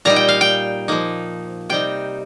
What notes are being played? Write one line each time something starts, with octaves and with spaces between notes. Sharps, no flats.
A#2 G3 D#4 A#5
G5
F5
G5
F3 A#3 D#4
C3 G3 D#4 G5